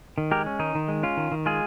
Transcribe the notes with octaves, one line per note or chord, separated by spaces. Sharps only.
D#3
G#3 G4 A#4
C#4
D#3 D#4
D#3
G#3
C#4 F4
D#3
D#3
G#3 F4 G#4